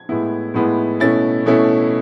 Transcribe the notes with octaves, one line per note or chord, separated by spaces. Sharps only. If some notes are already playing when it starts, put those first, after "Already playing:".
Already playing: G#6
A2 G#3 B3 E4
A2 G#3 B3 E4
B2 A3 C#4 E4 A6
B2 A3 C#4 E4